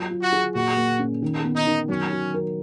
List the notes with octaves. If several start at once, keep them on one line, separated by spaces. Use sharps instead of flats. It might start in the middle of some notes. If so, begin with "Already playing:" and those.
Already playing: F#3 F4
F4
F#4
G#4
A#2 F#4
A#3
C#4
D#3
B3
D#4
D#3
F#3 C#4
F#4
A#4